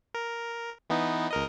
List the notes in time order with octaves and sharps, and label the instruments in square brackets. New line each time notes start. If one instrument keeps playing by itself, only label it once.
[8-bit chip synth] A#4
E3 B3 D#4
C#2 A#4 D#5